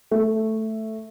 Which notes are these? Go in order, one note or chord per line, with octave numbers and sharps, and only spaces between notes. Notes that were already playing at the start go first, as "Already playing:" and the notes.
A3